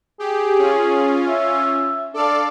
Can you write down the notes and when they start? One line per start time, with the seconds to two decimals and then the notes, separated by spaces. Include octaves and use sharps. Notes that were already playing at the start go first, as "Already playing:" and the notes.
0.20 G4 G#4
0.58 C#4 F4
1.28 E5
2.14 D4 A4 D5 F5